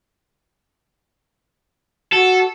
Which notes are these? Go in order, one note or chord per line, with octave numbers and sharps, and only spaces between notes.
F#4 A4